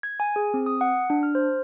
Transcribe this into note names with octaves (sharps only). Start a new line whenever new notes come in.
G#6
G#5
G#4
C4
D#6
F#5
D4
F6
C5